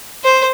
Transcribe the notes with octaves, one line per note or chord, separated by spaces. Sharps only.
C5